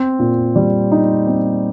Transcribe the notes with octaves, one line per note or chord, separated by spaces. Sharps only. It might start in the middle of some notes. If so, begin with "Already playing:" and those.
Already playing: C4
A#2
G3
D#4
C4